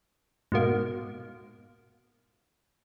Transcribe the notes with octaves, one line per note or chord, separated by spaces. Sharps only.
G#2 B2 A#3